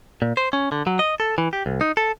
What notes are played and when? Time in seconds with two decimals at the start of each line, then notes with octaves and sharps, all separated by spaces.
0.22 A#2
0.37 C5
0.53 C#4
0.72 D3
0.87 F#3
0.99 D#5
1.20 A4
1.38 E3
1.53 G4
1.66 C2
1.81 D#4
1.97 A4